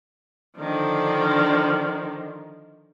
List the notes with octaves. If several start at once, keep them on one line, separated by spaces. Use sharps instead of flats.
D3 D#3 F3 D4